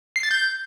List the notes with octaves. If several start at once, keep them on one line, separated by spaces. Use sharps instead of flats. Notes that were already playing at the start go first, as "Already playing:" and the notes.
C7
A6
G6